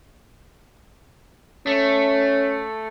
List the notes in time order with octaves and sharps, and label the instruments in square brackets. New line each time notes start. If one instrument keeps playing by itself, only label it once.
[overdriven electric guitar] A3 [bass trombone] C#4